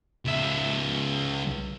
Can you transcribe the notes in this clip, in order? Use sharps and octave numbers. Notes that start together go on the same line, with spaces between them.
C#2 E5